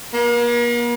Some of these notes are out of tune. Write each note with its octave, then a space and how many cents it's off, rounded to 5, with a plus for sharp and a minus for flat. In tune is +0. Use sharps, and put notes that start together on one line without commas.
A#3 +45